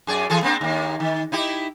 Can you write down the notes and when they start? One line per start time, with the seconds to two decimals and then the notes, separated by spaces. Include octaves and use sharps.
0.07 F#2 G#4 D5
0.30 E3 G#4 A4
0.43 A#3 C4 D4
0.61 D#2 A#3
1.00 D#3
1.32 D#4 E4 G4